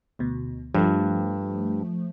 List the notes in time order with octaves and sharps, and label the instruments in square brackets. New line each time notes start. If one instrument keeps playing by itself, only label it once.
[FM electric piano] D2 B2
[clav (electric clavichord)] G2 [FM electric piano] F3 A3